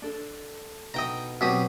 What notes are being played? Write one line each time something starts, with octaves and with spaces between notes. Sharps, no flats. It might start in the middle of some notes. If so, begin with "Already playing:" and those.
D4 A4
B2 D#4 D#5 G5 A#5
B2 F#3 C4 G4 D#6